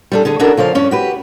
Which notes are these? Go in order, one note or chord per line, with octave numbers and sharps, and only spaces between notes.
G3 D4 A4
D3 G#4 A4
C#4 D4 E4 F#4 A4 A#4
C#3 F3 D5 F5
G2 C#4 D5
F#4 G4 B4